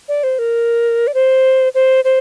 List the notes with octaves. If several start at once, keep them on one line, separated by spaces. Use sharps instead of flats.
D5
C5
A#4
D5
C5
C5
C5